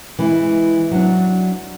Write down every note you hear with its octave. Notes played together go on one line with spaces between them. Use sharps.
E3 G#3 E4
F#3 D4